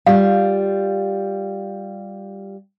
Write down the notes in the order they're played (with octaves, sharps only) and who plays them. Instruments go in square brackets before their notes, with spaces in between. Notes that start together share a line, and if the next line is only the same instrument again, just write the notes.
[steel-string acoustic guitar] G3 F4 [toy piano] F5